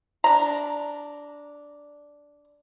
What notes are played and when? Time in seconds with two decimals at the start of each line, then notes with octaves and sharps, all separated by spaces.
0.24 D4 A#5